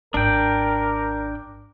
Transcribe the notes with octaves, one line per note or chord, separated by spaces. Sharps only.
G#1 D4 A#4 G5